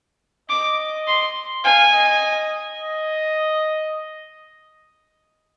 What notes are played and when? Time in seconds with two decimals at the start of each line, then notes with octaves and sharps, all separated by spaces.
0.49 D#5 D6
1.07 C6
1.64 F5 G#5
1.94 D#5
2.79 D#5